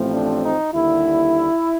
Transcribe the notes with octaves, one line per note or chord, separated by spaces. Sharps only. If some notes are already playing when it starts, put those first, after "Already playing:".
Already playing: A1 A2 F3 A3 C4
D4
D#4
D#2 D3 G3 E4